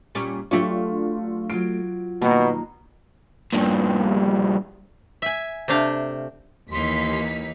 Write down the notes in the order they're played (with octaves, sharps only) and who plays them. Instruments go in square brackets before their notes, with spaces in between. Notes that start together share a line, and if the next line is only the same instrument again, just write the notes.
[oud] A#2 G3 C#4
[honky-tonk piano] F#3 D4 F4 [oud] A3 G4 C#5
[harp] F#3 F4 [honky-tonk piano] D7
[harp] G2 A#3 A#5 [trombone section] B2 [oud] D#3
[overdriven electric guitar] G2 A#2
[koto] E5 G#5
C3 A3 D4 F5
[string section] D#2 B6 [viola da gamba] E3 A#3 D#4 [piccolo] C6